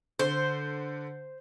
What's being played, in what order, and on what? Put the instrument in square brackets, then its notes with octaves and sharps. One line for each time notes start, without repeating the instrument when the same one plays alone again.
[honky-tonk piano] D3 [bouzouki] C5